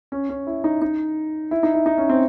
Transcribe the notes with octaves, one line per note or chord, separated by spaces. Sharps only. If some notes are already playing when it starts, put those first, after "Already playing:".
C#4
C#4
E4
D#4
D#4
E4
D#4
E4
D#4
C#4
C4